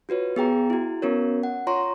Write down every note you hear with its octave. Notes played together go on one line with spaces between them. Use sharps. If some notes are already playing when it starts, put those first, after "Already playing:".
F4 F#4 B4 C#5
B3 G#4 G5 A#5
E4 F#4
B3 C#4 F#4 A#4 C#5
F#5
F4 C#5 A#5 C6 C#6